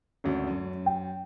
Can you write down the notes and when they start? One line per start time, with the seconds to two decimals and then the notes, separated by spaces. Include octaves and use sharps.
0.24 G#1 D2 C#4
0.47 F#2
0.86 G5